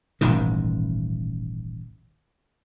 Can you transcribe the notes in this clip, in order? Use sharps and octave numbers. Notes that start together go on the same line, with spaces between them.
D#1 A1 G#2 D#3